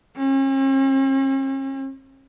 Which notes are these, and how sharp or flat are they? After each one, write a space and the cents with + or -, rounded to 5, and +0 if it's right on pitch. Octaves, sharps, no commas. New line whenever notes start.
C#4 -45